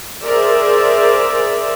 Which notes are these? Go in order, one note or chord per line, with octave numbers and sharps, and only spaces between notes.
G#4 A#4 C5 D5 E5